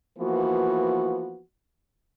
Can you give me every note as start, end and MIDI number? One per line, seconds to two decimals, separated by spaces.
0.19 1.40 52
0.19 1.40 53
0.19 1.40 58
0.19 1.40 59
0.19 1.40 66